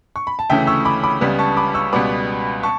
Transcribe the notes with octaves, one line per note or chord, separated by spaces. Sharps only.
C#6
B5
A5
D2 C#3 E3 A3 E5 G5
C#6 E6
B5 D6
B5 D6
C#2 C#3 G3 B3
A5 C#6
B5 D6
C#6 E6
C#2 B2 G3 B3 B5 D6
A5 C#6